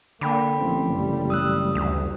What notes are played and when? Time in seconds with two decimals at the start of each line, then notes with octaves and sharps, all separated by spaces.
0.21 D3 A#3 G5 B5 D6
0.60 A1 F3 C4
0.90 F#1 G3
1.30 D#6 E6 F#6
1.75 D2